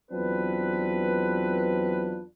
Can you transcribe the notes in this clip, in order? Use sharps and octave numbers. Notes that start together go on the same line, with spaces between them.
E2 F#3 C4 D4 F4 B4